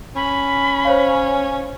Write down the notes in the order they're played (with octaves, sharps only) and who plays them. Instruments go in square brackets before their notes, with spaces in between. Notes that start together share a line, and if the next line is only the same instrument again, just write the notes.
[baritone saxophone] C#4 [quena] B5
[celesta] C5 C#5 F5